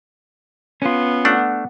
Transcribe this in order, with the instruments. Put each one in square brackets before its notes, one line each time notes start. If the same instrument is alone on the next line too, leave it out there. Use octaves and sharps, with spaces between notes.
[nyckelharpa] B3 [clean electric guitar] C#4 F4
[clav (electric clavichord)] A3 D4 [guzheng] F#5